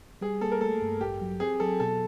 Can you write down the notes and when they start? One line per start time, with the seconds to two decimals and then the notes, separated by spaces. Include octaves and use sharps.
0.21 G3 G#4
0.41 A#3 A4
0.52 A#4
0.61 A3 A4
0.82 G2
1.01 A1 G4
1.21 F#3
1.40 C4 G#4
1.60 F#3 A4
1.80 B2 A4